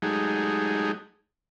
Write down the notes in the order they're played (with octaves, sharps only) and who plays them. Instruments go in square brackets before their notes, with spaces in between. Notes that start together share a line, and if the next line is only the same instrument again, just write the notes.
[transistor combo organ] F#3 G#3 A3 D#4 G4 G#4